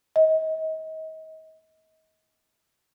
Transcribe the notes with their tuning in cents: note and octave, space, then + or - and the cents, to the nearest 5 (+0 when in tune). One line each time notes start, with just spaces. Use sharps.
D#5 +35